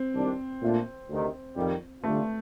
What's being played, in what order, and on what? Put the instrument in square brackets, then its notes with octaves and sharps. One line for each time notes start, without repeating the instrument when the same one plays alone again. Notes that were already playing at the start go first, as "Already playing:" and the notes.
Already playing: [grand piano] C4
[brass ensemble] C2 C3 D#3 G3 D4
A#2 A3 D4 F4
D2 C3 D#3
F2 D#3 G3
[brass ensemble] D3 G3 D4 F4 [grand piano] A3